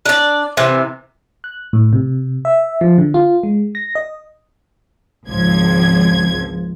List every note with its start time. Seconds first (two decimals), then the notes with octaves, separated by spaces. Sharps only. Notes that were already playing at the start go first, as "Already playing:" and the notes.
0.06 D4 D5
0.57 C3 E3
1.44 F#6
1.73 A2
1.93 C3
2.45 E5
2.81 F3
2.98 D3
3.14 F4
3.43 G#3
3.75 A#6
3.95 D#5
5.27 G#1 C#2 F3 G#6